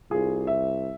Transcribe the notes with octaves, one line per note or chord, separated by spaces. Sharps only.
C2 F4 G#4
E5